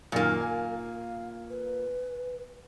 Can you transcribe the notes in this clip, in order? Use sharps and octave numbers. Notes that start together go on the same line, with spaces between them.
F#2 A#2 D#3 A#3 A#4
G#5
F5
B4